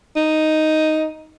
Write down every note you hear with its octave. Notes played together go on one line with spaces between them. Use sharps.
D#4